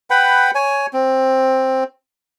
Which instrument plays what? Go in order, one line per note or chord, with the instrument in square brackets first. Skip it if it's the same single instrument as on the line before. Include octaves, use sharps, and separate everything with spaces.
[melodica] B4 F#5 G5 B5
C#5 G#5
C4